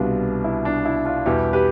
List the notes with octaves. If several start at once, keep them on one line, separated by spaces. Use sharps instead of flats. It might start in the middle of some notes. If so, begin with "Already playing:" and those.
Already playing: C2 B2 G3 D4 F4
E4
D4
E4
D4 F4
E2 B2 G3 E4 G4
G4 B4